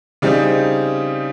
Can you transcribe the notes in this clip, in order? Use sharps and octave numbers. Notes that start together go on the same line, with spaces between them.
C#3 G3 C4 D#4